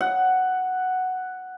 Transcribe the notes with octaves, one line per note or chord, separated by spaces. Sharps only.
F#5